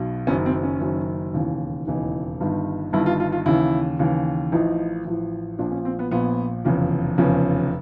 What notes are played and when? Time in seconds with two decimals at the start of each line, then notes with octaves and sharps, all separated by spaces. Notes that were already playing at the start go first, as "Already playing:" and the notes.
Already playing: B1 B2
0.27 F#1 F#2 D#3 C#4
0.46 C4
0.63 C#4
0.81 F#1 F#2 D#3
1.34 E1 D#2 C#3 E3
1.87 E1 D#2 C#3 E3 D#4
2.40 G1 G2 D#3
2.93 G1 G2 D#3 E4
3.06 F4
3.20 F4
3.32 F4
3.46 D#2 C#3 E3 E4
3.99 D#2 C#3 E3
4.52 A1 A2 F3 D#4
5.05 A1 A2 F3
5.59 A#1 A#2 F3 D4
5.72 C#4
5.85 C4
5.99 B3
6.11 A#1 A#2 F3 B3
6.65 F1 E2 C#3 F3
7.18 F1 E2 C#3 F3 C#4